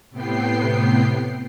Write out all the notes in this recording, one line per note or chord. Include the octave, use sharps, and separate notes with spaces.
A2 C3 B3 G5 C7